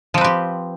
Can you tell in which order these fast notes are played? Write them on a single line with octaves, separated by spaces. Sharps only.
F3 C4 B4 G4